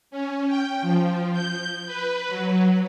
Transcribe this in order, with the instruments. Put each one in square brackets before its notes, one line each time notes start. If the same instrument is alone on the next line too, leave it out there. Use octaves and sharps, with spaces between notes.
[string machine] C#4
G5
F3
G6
B4
F#3